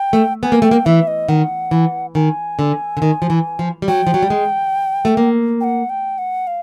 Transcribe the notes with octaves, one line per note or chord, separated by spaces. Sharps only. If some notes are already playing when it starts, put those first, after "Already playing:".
Already playing: G5
A3
B3 G#5
A#3
A3 G5
A#3
E3 E5
D#5
D#3 F#5
E3
D#3 G#5
D3
D3
D#3
F3
E3
F3
G3
F#3 G5
F3
F#3
G3
G#3
A3
A#3
G5
F#5
G5
F#5
F5